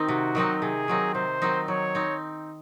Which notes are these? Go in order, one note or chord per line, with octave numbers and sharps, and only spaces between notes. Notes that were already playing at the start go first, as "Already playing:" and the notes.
Already playing: D#3 C4 D#4
C3 F#4
D#3 F#3 C4 D#4
C3 G#4
D#3 F#3 C4 D#4
C3 C5
D#3 F#3 C4 D#4
F#3 C#5
C4 D#4